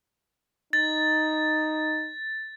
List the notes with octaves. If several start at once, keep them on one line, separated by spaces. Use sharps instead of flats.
D#4 A6